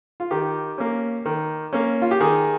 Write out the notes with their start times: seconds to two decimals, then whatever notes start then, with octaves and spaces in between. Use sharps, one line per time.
0.20 F4
0.31 D#3 G4
0.78 A#3 C#4
1.25 D#3
1.73 A#3 C#4
2.02 F4
2.11 G4
2.21 D#3 G#4